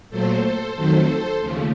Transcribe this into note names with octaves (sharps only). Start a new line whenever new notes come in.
A#2 F#3 A3 A4 C5
F2 D#3 F#3 A3 A4 C5
D#2 C#3 F3 A3